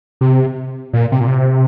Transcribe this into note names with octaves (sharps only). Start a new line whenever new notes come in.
C3
A#2
C3
A#2
C3